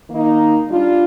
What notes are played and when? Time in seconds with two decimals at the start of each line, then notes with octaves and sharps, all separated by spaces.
0.10 D#3 A#3 D#4
0.68 G3 D4 F4